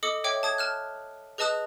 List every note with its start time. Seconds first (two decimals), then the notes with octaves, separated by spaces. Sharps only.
0.03 A4 D#5 D6 D#6 C#7
0.24 C#5 E5 G5 D6
0.43 A5 D#6 G#6
0.58 A5 F6 F#6
1.38 G#4 B4 D#5 A5 D#6 F#6